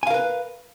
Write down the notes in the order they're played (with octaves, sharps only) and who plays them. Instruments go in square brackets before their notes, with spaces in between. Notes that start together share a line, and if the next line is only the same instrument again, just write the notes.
[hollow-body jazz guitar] G#5
F5
A#4
B4